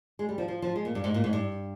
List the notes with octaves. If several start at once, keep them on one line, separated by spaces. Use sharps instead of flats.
G#3
G3
F3
F3
F3
G#3
A#2
G2
G#2
A#2
G#2
G2